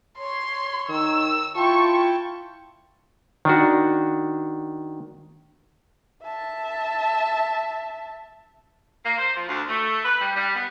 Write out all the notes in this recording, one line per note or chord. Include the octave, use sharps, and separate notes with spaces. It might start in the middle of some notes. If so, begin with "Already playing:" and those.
C#5 C6
D#3 E6
E4 F4 G5 A5 C#6
D#3 D4 F#4
E5 A5
A#3
C5
F3
D2
A3
B4
G3
G3
B3